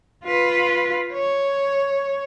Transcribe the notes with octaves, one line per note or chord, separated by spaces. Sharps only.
F4 B4
C#5